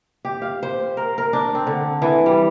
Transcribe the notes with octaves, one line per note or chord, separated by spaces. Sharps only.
G4
F5
C5
A#4
A#4
D4
C4
D3
E3
G3